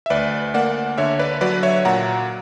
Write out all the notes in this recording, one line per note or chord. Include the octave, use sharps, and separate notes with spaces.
E5
D2 B4 D5
A#3 D5 F#5
D3 C#5 E5
B4 D5
F#3 B4 D5
C#5 E5
A#2 F#5 A#5